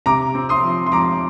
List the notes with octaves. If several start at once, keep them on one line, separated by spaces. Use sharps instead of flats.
C3 A#5 D6
C4
C6 D#6
F3
C6
F3 A#5 D6